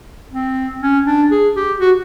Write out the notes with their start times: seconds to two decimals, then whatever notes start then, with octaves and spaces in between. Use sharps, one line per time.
0.33 C4
0.82 C#4
1.06 D4
1.31 G#4
1.56 G4
1.80 F#4